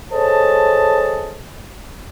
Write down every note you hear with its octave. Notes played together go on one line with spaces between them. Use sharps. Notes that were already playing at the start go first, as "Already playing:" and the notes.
G#4 A4 C5 C#5 D#5 A5